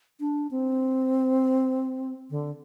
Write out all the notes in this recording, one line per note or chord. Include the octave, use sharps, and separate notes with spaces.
D4
C4
D3